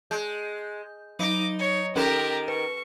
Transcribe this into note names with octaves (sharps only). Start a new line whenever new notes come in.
G#3 G6
F#3 D#4 D6 A#6
C#5
D#3 C#4 G4 A4 A#4 A#5 E7
B4 C#6